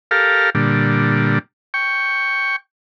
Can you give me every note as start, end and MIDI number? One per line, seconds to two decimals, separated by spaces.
0.11 0.50 67
0.11 0.50 69
0.11 0.50 70
0.11 0.50 77
0.55 1.39 46
0.55 1.39 50
0.55 1.39 55
1.74 2.56 79
1.74 2.56 85